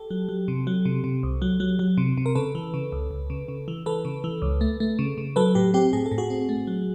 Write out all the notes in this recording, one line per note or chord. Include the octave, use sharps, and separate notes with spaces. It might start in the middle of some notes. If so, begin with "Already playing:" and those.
Already playing: G4 A4
F#3
F#3
C3
F#3
C3
C3
C2
F#3
F#3
F#3
C3
C3
A#4
C#3 A4 B4
E3
C#3
C#2
C#2
C#3
C#3
E3
E3 A4 B4
C#3
E3
C#2
A3
A3
C#3
C#3
F#3 A4 B4
A2 G4
C4 G4
A2 G#4
A4
A2
F#4 G#4
C4
A3
F#3